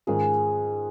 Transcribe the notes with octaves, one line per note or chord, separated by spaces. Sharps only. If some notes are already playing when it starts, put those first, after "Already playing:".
G#2 D#3 C#4 F4 G#4 A#4